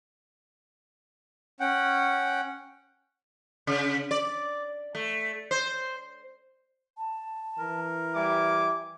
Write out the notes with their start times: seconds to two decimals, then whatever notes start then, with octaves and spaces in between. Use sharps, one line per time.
1.60 C#4 F#5 G5
3.67 C#3
4.11 D5
4.95 A3
5.51 C5
6.97 A5
7.58 E3 A#4
8.15 G3 E5 G#5 D6